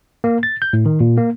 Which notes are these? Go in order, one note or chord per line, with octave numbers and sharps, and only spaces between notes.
A#3
A6
G6
A2
D#3
A#2
A#3